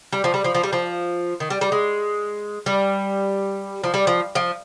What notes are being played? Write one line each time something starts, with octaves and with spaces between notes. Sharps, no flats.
G3
F3
G3
F3
F3
G3
F3
D#3
G3
G3
G#3
G3
F3
G3
F3
F3